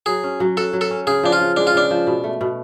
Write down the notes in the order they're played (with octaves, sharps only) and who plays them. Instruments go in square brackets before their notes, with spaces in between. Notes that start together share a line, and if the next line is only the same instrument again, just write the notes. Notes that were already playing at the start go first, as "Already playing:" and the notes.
[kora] F#3 [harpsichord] G#4
[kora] C#4
F#3
[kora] F#4 [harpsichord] A4
[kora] F#3
[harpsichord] A4
[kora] C#4
[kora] C#3 [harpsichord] G#4
[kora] F3 [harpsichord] D4
[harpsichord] F4
[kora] C#3
[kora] G#3 [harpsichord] D4
[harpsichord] F4
[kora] C#3 [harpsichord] D4
[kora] F3
B2
A3
B2